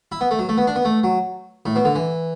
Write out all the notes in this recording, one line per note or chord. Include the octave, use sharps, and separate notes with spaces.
E4
B3
A3
F#3
A3
B3
D4
B3
A3
F#3
A2
B2
D3
E3